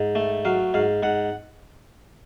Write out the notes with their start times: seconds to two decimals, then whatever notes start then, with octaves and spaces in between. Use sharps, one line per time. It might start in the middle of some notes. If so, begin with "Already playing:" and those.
Already playing: G#2
0.15 A3
0.45 F#3 F5
0.74 G#2 F5
1.03 G#2 F#5